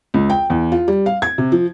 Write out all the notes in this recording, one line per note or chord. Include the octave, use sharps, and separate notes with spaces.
C#2
G5
E2
F4
G3
F5
G#6
C3
F3